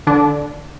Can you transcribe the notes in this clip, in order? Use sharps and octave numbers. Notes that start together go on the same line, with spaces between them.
D3 D4